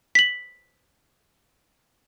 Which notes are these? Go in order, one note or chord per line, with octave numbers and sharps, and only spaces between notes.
B6 F#7